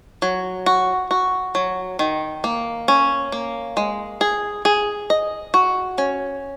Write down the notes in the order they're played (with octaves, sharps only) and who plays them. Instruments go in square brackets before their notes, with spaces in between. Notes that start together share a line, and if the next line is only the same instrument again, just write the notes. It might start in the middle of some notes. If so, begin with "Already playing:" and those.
[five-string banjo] F#3
F#4
F#4
F#3
D#3
A#3
C#4
A#3
G#3
G#4
G#4
D#5
F#4
C#4